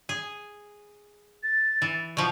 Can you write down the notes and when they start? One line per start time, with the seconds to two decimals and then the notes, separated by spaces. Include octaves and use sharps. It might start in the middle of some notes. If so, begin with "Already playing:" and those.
0.09 G#4
1.43 A6
1.82 E3
2.17 B2 F3 C#6